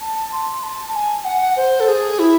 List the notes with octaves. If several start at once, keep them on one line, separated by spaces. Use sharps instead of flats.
A5
C6
A5
G#5
F#5
C5
A4
G#4
E4